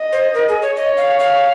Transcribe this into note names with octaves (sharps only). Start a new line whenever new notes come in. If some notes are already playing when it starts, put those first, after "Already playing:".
Already playing: D#5
C5
A#4
G#4
C#5
C#5 D#5
F5
F5